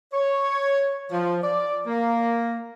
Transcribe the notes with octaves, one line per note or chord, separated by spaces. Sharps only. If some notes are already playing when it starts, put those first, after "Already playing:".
C#5
F3
D5
A#3